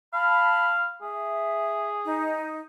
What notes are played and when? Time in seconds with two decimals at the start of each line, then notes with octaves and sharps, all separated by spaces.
0.13 F5 A5 B5
1.02 G#4 E5
2.05 D#4